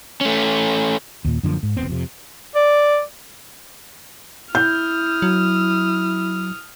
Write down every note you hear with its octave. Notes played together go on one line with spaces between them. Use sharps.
A3 C#4
D#2 A#2
F#2 D3 F3 A#3
G#2
F1 E2 B3 C4
F2 C3
D5
E4 D#6 F6 G6
F#3